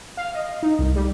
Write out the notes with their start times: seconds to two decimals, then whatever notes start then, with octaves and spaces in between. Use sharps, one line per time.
0.17 F5
0.34 D#5
0.63 D#4
0.79 C2
0.96 G3